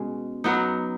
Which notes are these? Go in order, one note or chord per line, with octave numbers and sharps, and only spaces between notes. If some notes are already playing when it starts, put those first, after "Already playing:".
Already playing: B2 G#3 C#4
F#3 B3 D#4